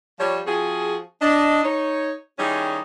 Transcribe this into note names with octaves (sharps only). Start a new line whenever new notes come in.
F3 G3 C#5
F3 C4 F#4 G#4
D4 D#5
D#4 C#5
D#3 G3 C#4 D#4 E4 G#4